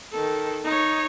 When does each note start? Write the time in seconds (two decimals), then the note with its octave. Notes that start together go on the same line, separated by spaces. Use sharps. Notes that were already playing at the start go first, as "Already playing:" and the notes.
0.12 D#3 A4
0.64 D#4 C#5